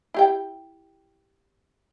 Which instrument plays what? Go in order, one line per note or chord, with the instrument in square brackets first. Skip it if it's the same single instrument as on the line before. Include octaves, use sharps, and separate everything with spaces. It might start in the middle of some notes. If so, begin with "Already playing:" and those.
[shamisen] E4 G4 G5